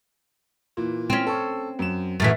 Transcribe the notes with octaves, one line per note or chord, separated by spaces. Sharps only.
A#2 E3
C4 C#4
A4 C#6
F#2 E7
F#2 A2 E3 A6 B6